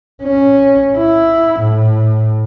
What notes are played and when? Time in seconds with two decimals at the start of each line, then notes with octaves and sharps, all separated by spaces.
0.23 C#4
0.97 E4
1.60 A2